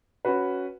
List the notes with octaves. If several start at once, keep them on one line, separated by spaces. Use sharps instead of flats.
C#4 F#4 B4